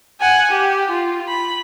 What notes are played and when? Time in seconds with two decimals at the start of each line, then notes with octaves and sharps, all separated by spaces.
0.21 F#5 G#5
0.51 G4
0.90 F4
1.28 B5